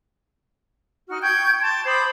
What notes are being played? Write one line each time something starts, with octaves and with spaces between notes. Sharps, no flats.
D#4 F#4 F6
G5 C#6 G6 G#6
A5 C6
C5 B5 D6 D#6